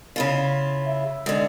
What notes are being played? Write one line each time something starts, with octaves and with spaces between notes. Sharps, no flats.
C#3 E4 F4
E5
G#2 D3